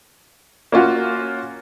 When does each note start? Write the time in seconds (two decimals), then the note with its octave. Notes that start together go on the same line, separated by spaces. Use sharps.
0.72 A#3 C#4 F4 F#4